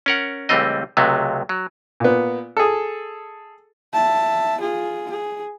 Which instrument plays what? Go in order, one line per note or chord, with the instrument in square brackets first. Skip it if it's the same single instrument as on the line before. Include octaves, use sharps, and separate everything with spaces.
[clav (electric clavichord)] C#4 A#4 F#5
C#2 E3 G3 A3 C4 D#5
C#2 C3 F#3 G#3 A3
F#3
[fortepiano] A#2 B3
G#4 A4
[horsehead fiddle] E5 A5
F4 G#4
G#4